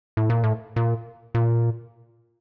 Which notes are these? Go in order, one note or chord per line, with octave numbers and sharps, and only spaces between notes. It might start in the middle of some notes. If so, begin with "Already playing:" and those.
A2
A#2
A2
A#2
A#2